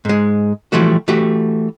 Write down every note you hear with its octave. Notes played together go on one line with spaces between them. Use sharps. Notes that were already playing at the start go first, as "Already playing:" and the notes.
G#2 G#3
E3 F3 G3 A3 F#4
E3 A3 F#4 G4